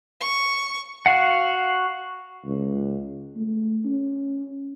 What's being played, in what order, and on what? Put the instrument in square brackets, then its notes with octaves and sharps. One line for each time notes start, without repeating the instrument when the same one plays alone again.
[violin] C#6
[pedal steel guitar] F#4 F5 F#5
[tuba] C#2
A3
C#4